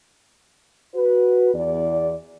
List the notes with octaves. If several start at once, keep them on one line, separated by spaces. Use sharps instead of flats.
F#4 B4
E2 D5